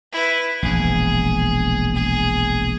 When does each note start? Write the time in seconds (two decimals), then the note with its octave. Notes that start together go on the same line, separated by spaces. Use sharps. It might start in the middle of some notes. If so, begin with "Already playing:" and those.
0.12 E4 B4
0.63 E1 A#1 G#4
1.95 G#4